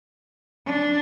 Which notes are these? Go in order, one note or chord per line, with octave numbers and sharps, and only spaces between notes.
D4